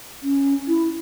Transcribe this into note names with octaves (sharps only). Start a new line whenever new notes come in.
C#4
E4